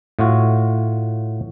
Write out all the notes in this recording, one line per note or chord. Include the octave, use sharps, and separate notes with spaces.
A2 F4 F#4